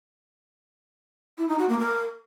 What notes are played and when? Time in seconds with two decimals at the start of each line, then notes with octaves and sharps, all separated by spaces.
1.38 E4
1.48 D#4
1.59 F#4
1.69 A#3
1.79 A#4